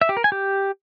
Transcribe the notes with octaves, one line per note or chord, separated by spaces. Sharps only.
E5
G4
A#4
G#5
G4